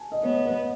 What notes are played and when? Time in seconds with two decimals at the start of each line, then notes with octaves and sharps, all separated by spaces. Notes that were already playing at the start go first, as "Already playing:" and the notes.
Already playing: G#5 A5
0.12 D#5
0.23 B3 C#5
0.45 B4